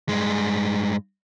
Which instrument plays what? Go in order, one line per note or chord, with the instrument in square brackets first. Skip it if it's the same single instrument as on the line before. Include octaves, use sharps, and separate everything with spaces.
[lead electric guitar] G2 G#3